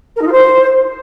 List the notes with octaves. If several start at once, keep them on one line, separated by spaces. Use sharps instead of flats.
A#4
D#4
F4
C5